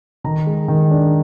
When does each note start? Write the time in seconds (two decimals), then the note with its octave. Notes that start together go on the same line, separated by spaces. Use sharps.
0.24 D#3 A#5
0.47 G#3
0.68 D#3
0.91 D4